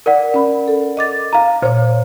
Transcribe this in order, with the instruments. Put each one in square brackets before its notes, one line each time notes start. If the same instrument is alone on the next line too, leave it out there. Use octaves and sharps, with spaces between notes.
[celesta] A#4 D5 F#5
[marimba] C#4 B5
A4
D#5 D6 A6
[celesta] F5 A#5
[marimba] A#2 C#5 [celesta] C5